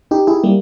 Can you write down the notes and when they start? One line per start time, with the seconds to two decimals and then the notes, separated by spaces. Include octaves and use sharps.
0.11 D#4 G4
0.27 E4 G#4
0.44 G3 A#3